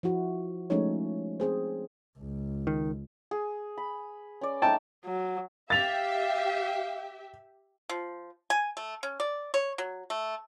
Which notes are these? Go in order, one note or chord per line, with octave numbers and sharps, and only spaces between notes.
F3 E4 F#4
F3 G#3 A3 C#4 D#4 C#5
C4 G#4 C5
C#2
D#3
G#4
B5
C#4 D5
A3 D#4 G5 A5
F#3
G4 E5 F5 A6 F7
F3
G#5
A3
C#4
D5
C#5
F#3
A3